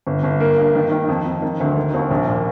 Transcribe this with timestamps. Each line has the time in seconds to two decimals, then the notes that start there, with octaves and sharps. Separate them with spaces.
0.07 G1
0.23 G1
0.40 A#3
0.58 G2
0.75 D#3
0.92 D#3
1.08 F2
1.26 F2
1.42 D#3
1.60 D2
1.77 D#3
1.94 D#2
2.11 A#1
2.27 A#2